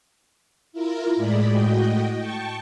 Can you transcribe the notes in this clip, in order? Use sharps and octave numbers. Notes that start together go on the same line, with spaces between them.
E4 F4 A#4
A2 G#3 G#4 D5 B5
A2 F#4 D#5 G5
G5 A5 C#6